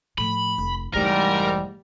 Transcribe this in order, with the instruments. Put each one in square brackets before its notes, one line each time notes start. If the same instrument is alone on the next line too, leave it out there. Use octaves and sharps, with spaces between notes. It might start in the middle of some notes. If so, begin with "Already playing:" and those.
[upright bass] A2 F3 [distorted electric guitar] B5
[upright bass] F1
[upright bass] F1 E3 [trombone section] G#2 G3 [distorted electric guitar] A#4